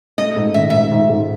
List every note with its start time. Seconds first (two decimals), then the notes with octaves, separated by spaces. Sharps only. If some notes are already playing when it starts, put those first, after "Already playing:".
0.18 A3 D#5
0.36 G#2
0.54 D#3 E5
0.70 G#2 E5
0.92 G#2
1.10 G#2